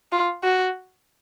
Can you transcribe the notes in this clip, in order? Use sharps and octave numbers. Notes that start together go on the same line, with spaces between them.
F4
F#4